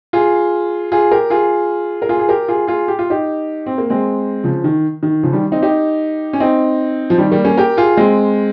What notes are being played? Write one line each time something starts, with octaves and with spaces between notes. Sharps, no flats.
F4 G#4
F4 G#4
G4 A#4
F4 G#4
A#4
F4 G#4
G#4
G4 A#4
F4 G#4
F4 G#4
G4
F4
D#4 G4
C4
A#3
G#3 C4
C#3 F3
D#3
D#3
C#3 F3
D#3 G3
C4 D#4
D#4 G4
C#4
C4 D#4
F3
D#3 G3
G3 A#3
A#3 C#4
G4 A#4
F4 G#4
G#3 C4